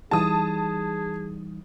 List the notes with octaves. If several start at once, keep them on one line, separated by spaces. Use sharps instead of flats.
E3 G3 D#4 G#4 A5 D#6